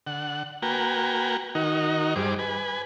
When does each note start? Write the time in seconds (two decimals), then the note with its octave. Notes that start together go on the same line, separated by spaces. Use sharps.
0.07 D3 F#5
0.62 A#3 F#4 B4 G5 G#5 A#5
1.55 D#3 D#4 F#4 A#4
2.16 G2 G3 G#4 C5 D6
2.39 B4 G#5